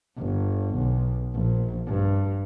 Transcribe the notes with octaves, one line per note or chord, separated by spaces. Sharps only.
G1
B1
A#1
G2